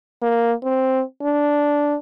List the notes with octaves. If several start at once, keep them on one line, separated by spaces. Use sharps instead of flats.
A#3
C4
D4